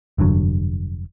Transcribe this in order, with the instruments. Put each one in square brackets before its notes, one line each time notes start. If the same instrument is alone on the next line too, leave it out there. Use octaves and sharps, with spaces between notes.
[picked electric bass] F1 G2 D3 F#3